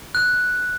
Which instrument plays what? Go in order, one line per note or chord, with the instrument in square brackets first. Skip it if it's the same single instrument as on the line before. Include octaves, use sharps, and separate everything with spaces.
[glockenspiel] F#6